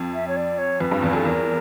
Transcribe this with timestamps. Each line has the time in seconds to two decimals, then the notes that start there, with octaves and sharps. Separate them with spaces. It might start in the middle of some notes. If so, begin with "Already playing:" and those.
Already playing: F2
0.14 E5
0.28 C#5
0.37 D5
0.58 C#5
0.80 F2 B4
0.92 G2
1.02 E2
1.13 F2 A4
1.25 E2 A#4